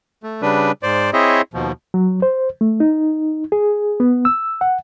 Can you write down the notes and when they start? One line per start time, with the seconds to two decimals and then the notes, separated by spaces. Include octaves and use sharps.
0.23 A3
0.42 C#3 G3 D4 B4
0.83 G#2 C5 D5
1.13 C4 E4 G#4 C#5 D#5 E5
1.54 D#2 B2 F3
1.94 F#3
2.22 C5
2.61 A3
2.80 D#4
3.52 G#4
4.00 B3
4.25 E6
4.61 F#5